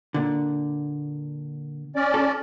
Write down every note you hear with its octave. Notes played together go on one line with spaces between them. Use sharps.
A#2 D3
C#4 D5
A4